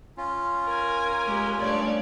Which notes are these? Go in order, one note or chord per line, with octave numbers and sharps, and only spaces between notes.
C#4 F4
A#4 G#5
G#3 G4
G2 A3 C#5 D5